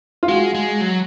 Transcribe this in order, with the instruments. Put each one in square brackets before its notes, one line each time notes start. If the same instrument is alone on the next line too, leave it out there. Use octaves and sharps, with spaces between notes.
[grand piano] F4
[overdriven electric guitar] G#3 [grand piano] F#4
[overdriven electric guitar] G#3
F#3